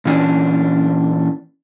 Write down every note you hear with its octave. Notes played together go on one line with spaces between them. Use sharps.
A#2 E3 C#4 D4